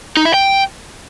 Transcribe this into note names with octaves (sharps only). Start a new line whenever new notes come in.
D#4
E4
G5